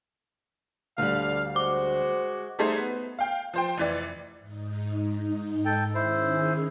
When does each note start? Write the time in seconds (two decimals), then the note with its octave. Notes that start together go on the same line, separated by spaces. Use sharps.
0.98 D2 D3 G3 F5
1.56 G#3 F#4 C5 D6
2.59 G3 A3 D#4 G#4 A4 C5
2.78 B3
3.19 F5 G5
3.54 F3 C5 G5
3.78 F1 E3 D5
4.39 G#2 D#4
5.65 A4 G5
5.95 D#3 C#4 E4 G#4 C5